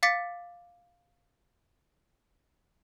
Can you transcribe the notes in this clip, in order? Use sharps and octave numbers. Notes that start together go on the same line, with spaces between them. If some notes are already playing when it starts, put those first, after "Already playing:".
F5 D6 A6 B6 C#7